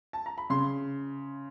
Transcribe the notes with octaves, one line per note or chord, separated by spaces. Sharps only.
A5
A#5
B5
C#3 C6